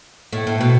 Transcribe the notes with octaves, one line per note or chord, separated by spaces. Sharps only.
A2
A2
B2